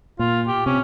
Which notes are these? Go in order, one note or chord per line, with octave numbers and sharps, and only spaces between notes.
A#2 F4
G4
C3 C#4